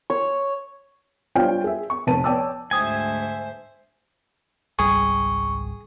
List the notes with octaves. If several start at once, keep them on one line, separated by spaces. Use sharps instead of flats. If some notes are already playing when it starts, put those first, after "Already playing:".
C#5
G3 D4 F4 C5 C#5 G5
G#4 E5
C#6
F1 B4 A5 D#7
C#5 D5 G5 A5 D6 E6
D2 G#2 C5 E5 G5 G#5 D#6
G#1 C#2 G3 G#4 C#6